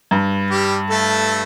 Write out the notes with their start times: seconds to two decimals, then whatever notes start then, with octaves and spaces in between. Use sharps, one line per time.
0.11 G2
0.50 G3 G4
0.90 A3 A4